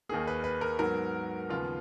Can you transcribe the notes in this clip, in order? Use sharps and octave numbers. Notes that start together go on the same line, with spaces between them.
D#2 D#3 A#3 G#4
B4
B4
A#4
G#2 F#3 B3 A#4
D#2 C#3 F3 B3 F4